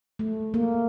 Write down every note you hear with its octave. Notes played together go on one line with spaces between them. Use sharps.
A3
A#3